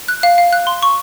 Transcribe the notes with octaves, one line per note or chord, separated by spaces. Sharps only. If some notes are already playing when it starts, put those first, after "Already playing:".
F#6
F5
F5
F#6
C6
C#6